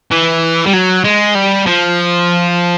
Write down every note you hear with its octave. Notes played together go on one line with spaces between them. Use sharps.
E3
G3
F#3
G#3
G3
F3